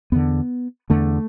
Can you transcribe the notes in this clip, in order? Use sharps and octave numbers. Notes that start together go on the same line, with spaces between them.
E2 D3 B3
E2 D3 A3